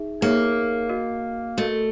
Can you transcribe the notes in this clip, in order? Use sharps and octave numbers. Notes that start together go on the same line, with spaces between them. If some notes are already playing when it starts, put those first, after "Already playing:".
Already playing: D#4 G#4 E5
A#3 D#4 G#4 C#5 E5
F#4 A#4 D#5
A3 F#4 A#4 D#5